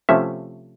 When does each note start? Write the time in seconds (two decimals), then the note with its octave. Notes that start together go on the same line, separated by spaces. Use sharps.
0.09 C3 F3 A3 C#4 E5